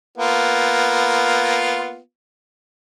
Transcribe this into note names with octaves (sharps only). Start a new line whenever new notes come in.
A#3 B3 F4